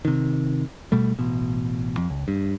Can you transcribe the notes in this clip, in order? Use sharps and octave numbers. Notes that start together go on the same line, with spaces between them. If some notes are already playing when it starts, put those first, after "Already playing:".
C3 D#3
B2 G3 A3
A1 B2
F2
C#2
G2